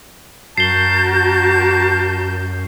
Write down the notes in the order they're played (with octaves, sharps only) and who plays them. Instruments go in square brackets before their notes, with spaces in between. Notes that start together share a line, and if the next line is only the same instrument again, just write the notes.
[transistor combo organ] F#2 [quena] F#4 [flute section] A#4 A5 G6 [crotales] C7 G7